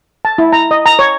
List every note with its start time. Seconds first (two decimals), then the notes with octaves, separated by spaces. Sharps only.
0.25 A5
0.38 E4
0.52 A#5
0.71 D#5
0.86 A#5
0.99 C#5